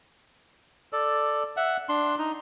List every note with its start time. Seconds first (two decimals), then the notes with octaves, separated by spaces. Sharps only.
0.93 A4 D5
1.57 E5 F#5
1.89 D4 C6
2.18 D#4